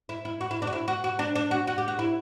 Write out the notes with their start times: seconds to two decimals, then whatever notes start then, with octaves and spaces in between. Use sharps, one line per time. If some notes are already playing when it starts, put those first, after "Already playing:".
0.09 E4
0.25 E4
0.41 F#4
0.51 E4
0.62 D4
0.67 F#4
0.73 E4
0.88 F#4
1.04 F#4
1.19 D4
1.35 D4
1.51 F#4
1.67 F#4
1.78 G4
1.88 F#4
1.99 E4